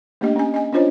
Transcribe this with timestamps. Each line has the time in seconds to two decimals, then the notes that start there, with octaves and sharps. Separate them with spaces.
0.21 A3 A#3 D4 G4 D#5
0.36 C#4 G#5
0.54 D#5 G#5
0.73 C#4 D4 F4 C5 C#5 D#5